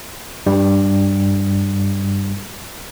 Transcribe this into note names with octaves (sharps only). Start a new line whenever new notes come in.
G2 G3